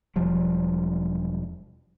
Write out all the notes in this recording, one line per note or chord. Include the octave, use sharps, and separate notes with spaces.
E1 F3 G3